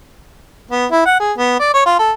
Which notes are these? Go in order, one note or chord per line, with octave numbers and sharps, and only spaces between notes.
B3
E4
F#5
G#4
B3
D5
C#5
F4
A4